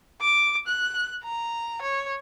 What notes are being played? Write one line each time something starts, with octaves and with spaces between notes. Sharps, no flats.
D6
F#6
A#5
C#5